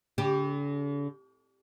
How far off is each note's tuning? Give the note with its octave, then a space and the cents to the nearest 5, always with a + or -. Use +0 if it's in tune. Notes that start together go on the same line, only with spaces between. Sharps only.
D3 -45 G4 +0